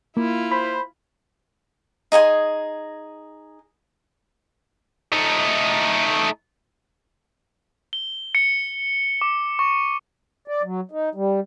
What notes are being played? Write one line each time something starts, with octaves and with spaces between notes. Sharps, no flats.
A#3 E4 F4
C5 B5
D#4 G#4 G#5 C6
A3 D#4
G7
C#7
D6
C#6
D5
F#3
D#4
G3